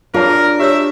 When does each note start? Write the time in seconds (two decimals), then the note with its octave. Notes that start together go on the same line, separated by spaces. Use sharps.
0.14 G3 D4 F4 G#4 A#4 C#5 D5 A5
0.60 G4 C#5 E5 E6